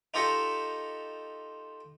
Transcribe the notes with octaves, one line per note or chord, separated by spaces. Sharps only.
D#4 F4 G4 A4 D#5 C#6